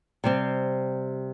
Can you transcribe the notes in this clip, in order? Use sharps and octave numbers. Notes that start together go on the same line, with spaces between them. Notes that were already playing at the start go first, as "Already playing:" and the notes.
C3 G3 C4